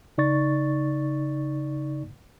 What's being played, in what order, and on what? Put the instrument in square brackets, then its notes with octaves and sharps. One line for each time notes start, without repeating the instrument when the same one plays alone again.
[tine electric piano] C#3 D#4 D5 C#6 A6